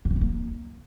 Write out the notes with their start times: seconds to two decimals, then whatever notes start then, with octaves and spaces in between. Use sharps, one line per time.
0.05 D3
0.10 D#3
0.16 E3
0.21 A#3